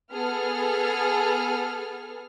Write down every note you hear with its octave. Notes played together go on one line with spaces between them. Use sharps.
B3 G#4 A4 F6